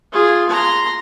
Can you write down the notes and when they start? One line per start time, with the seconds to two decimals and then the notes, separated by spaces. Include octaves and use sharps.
0.12 F4 G#4
0.49 A#5 C6